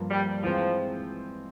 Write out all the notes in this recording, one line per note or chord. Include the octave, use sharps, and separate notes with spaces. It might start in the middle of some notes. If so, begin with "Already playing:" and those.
Already playing: G2 F3 A#3
G3
E3 F3 G#3 C4